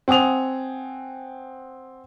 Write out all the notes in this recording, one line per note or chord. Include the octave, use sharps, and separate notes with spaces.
C4 F#5 G#5 D#6 F7